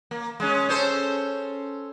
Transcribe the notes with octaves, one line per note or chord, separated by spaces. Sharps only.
A#3
G#3 C#4
C#4 A4 C5